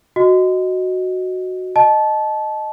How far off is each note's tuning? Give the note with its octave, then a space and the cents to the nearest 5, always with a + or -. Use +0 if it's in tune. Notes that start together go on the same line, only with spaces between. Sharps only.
F#4 +0 D#5 +0
D#5 -10 A5 -20